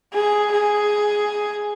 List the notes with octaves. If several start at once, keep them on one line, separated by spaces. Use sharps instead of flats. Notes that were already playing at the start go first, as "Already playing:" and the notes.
G#4
G#4